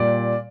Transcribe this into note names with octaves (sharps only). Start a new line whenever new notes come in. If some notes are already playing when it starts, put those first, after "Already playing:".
Already playing: A#2 G3 D5